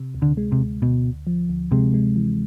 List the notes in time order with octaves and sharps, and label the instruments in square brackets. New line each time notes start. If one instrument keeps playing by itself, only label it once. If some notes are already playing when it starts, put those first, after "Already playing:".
Already playing: [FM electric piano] C3
D2
[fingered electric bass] D3
[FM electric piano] G#3
[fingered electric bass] C3
[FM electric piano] D2
[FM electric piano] D2 [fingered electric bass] B2
[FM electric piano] D2
F3
D2
[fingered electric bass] C3 [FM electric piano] G#3
[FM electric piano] G#3
E3